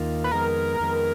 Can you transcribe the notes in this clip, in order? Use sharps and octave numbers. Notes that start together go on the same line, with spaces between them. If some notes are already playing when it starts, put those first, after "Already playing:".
Already playing: D#2 D#3 A#3 F4
B4
F2 D#3 G#3 B3 A#4
F2 D#3 G#3 B3